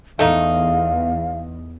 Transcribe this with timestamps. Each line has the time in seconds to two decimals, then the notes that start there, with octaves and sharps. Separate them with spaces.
0.19 E2 A3 D#4 F5